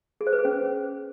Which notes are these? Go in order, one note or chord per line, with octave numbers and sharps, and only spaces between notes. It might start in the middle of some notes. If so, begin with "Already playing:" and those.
G#4
C5
B4
G#4
C#4